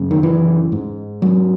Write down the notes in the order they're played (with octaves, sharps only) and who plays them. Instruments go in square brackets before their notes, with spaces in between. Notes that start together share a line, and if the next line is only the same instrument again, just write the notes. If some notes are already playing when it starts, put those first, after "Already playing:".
Already playing: [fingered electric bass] F#2 C#3
D#3
E3
G#2
F#3